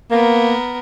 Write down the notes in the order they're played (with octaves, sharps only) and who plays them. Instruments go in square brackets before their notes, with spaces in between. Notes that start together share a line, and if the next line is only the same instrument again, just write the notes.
[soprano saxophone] A#3 [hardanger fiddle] B3 A#4